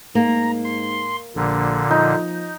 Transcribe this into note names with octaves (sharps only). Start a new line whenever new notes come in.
G#2 A#3 A#5
C6
A#1 A#2 D3
F3 D#4